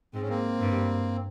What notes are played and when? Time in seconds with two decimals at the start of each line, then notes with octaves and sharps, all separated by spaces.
0.14 G#2 G#3 C4
0.21 C#4
0.29 A#3 C4
0.60 G2 G3